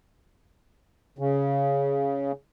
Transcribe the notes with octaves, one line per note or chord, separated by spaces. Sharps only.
C#3